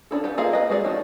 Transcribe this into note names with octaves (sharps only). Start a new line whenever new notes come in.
C#4 D4 E4 A4
G4 A4 B4 F#5
A#3 F4 G#4 D#5 F5
B4 D#5 G5
G#3 F#4 G#4 B4 D5
F3 A3 C#4 D#4